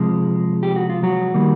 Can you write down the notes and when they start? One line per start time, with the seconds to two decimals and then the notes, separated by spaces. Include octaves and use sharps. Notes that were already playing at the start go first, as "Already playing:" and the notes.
Already playing: C3 F3 G#3
0.63 G4
0.76 F#4
0.90 F4
1.03 F#3 F#4
1.34 D#3 G3 A#3